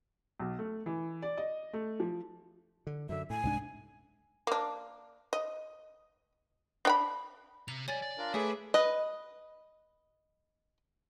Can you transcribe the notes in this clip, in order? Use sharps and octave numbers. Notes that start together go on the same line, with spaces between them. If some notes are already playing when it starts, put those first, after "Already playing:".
B1
A3
E3
D5
D#5
A3
F3
D3
F#2 D3 E5
A2 G#5
C2 G#2 D4
A#3 D4
D#5
D4 G5 B5
C3 A#5 F7
G3 C#5 D5 G#5 A6
D5
D4 F4 A#4
A3 G#4 B4 C#5 E5 D6
B4 D#5